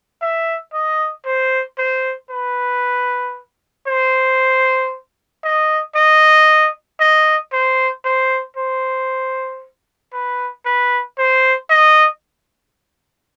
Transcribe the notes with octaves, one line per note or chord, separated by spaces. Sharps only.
E5
D#5
C5
C5
B4
C5
D#5
D#5
D#5
C5
C5
C5
B4
B4
C5
D#5